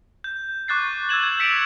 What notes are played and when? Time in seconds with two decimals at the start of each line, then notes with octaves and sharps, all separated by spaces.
0.24 G6
0.68 C#6 D6 F#6 A6 C7
1.09 E6 G6 G#6 E7 F#7
1.22 G#6 E7
1.39 E6 B6 C#7 D7 E7 F7